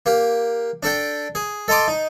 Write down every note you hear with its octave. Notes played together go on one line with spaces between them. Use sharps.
A#3 G4
D4 A4 G5
G#4
A4 D#5 A#5 C6 D6
D#4